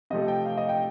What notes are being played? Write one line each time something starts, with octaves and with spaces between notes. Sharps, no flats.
C3 F3 A3 D#5
G5
F5
D#5
G5